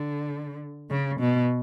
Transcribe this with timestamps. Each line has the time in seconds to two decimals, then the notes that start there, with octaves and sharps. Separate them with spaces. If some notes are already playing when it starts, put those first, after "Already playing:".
Already playing: D3
0.91 C#3
1.20 B2